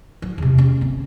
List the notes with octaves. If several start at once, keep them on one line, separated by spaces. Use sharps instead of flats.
F#3
E2 C3
C#4
G1 C4